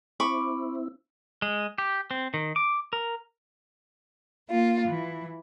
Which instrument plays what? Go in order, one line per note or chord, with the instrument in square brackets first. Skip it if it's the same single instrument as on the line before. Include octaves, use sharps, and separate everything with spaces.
[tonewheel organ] C4 E4 [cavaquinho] B5 C#6 D6
[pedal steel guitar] G#3
G4
C4
D#3
D6
A#4
[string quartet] A#3 F4
E3